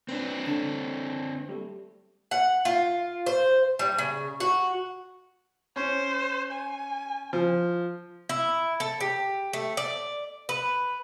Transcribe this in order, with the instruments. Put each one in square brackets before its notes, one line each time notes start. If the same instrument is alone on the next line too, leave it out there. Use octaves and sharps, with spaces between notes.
[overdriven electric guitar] C4 D4 [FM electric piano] B4
[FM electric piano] D3 A5
G3 A3
[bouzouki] F#5
F4
C5
G3
C#3
F#4
[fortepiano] C#4 [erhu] C5
[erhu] G#5
[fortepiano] F3
[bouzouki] E4
A4
G4
A3
D5
B4